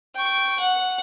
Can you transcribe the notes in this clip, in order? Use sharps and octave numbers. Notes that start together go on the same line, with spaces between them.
G5 C#6
F#5